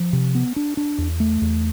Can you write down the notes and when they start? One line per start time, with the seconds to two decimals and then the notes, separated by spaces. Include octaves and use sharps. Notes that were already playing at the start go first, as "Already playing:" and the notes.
Already playing: F3
0.13 C3
0.35 B3
0.56 D4
0.77 D4
0.98 E2
1.20 A3
1.41 E2